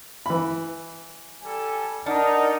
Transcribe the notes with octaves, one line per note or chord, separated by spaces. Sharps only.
E3 B5
G3 A4 G#5
D4 D#4 A#4 D5 F#5